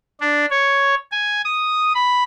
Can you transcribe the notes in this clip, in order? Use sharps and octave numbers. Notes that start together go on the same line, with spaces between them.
D4
C#5
G#5
D#6
B5